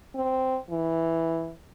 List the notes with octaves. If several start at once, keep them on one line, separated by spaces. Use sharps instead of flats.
C4
E3